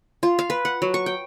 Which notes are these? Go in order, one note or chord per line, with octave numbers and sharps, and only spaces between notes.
F4
F5
B4
F#5
F#3
C#6
G5